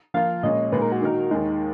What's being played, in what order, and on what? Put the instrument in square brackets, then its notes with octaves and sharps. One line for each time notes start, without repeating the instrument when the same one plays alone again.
[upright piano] F3 A#3 F4 [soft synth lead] F5
[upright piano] A#2 G#3 C#4 [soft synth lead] D#5
[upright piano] A#2 G#3 D#4 [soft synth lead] B4
[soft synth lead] A#4
F#4
[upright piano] D#3 A#3 D#4 A#4
[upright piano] D#2 D#3 G#3 [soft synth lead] D#4